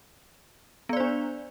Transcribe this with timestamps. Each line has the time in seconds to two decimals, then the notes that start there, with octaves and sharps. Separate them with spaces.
0.89 B3
0.93 D5
0.97 C5
1.00 D4